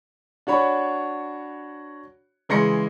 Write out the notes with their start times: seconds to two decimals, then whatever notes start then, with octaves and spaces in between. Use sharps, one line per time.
0.47 D4 F#4 C#5 B5
2.49 C#3 E3 G#3 C6 A#6 C#7